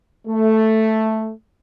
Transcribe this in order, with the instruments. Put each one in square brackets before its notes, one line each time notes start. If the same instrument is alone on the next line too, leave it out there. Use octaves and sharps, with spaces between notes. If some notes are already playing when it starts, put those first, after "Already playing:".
[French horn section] A3